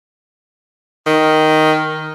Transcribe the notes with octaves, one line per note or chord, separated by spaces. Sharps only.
D#3